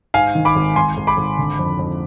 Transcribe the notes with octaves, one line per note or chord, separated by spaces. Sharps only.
G#2 F5 G#5
D#3
B5 D6
G#1
G#1 G#5 C6
G#1
B5 D6
G#1
D3
F2
F2